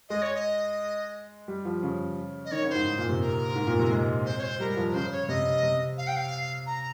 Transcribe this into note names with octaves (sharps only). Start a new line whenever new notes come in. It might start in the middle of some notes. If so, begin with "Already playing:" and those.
G#3 D#5
C#5
D#5
G3
F3
C#3
D#5
D#3 C#5
C#3
C5
G#2
G#2
A#2
C3
A#4
G#2
A#2
C3
G#3
C5
C#5
C5
G3 A#4
F3
A#4
C#3 C5
C#5
C3 D#5
C3
F5
G5
F5
A#5